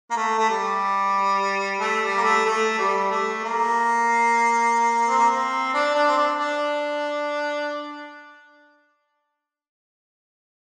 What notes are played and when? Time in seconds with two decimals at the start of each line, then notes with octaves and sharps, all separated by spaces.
0.10 A#3
0.16 A3
0.38 A3
0.49 G3
1.80 A3
2.03 G3
2.18 A#3
2.24 A3
2.46 A3
2.79 G3
3.11 A3
3.44 A#3
5.08 C4
5.18 A#3
5.27 C4
5.74 D4
5.95 D4
6.08 C4
6.17 D4
6.39 D4